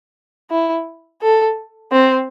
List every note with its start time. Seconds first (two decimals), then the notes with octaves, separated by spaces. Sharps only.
0.51 E4
1.22 A4
1.92 C4